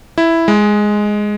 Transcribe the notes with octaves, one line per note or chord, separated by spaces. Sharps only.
E4
G#3